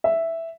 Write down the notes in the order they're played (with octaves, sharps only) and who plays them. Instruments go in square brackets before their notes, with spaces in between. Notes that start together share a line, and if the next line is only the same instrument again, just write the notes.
[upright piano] E5